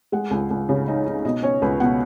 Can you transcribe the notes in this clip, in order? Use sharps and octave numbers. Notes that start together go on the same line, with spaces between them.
G#3 F#5
C#2
C#2
C#3
D#4
D#4
B2 D#5
C#4 C#5
C#2 B4
B2 F#5